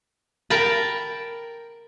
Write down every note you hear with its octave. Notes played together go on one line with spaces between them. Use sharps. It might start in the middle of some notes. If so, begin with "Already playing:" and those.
A#4 G5 A5 B5